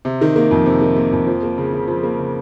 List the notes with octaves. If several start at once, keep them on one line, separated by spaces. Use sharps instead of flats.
C3
D#3
A#3
F2
C3
D#3
A#3
F2
F3
A#3
C#3
C#3
F3
A#3
C#3